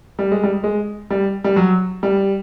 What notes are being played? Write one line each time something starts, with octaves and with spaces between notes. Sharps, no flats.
G3
G#3
G3
G#3
G3
G3
F#3
G3